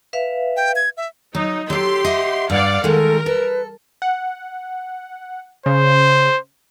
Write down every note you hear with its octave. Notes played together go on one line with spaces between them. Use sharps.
B4 E5 F5
G5
G#6
E5
F#3 D#4
F#3 G4 A4 C6
D#5 E5 F#5
G2 D5 F5 F#5
D#3 G#3 A4 A#4
A4 B4
F#5
C#3 C5